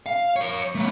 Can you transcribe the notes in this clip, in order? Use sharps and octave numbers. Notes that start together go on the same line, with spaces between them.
F5
A#4 C#5
A3 B3